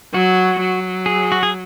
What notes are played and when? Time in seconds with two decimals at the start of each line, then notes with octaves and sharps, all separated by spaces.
0.14 F#3 F#4
0.61 F#3
1.06 G#4
1.32 F#4
1.43 G#4